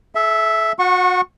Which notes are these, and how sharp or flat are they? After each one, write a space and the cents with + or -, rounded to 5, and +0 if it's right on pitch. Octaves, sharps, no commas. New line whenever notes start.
A4 -40 E5 +0
F#4 -35 F#5 +0 C#6 -20